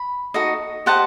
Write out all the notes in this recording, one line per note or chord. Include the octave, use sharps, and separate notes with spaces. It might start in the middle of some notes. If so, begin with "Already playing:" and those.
Already playing: B5
D#4 F#4 A4 D#5
G4 C5 D#5 F#5 A5